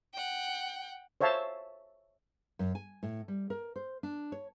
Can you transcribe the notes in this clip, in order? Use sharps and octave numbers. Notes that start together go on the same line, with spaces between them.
F#5 G5
C5 C#5 E5 F5 A5
F#2
G#5
A2
G3
A#4
C5
D4
C#5